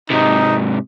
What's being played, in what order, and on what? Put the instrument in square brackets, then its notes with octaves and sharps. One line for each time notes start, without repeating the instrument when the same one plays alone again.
[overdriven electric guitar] G#2 C3 [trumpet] D#4